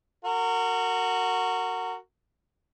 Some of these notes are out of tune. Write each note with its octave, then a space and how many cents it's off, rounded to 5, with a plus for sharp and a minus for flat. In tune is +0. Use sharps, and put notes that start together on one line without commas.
F#4 +0 A#4 -30